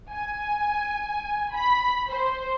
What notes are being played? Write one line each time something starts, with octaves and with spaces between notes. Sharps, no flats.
G#5
B5
C5